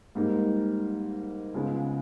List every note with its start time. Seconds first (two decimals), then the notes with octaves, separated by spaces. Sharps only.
0.15 G#2 G3 A#3 D#4
1.54 C#2 C#3 G#3 B3